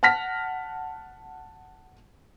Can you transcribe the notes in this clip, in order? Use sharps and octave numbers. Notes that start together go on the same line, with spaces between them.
F#5 A5 F6 A#6 B6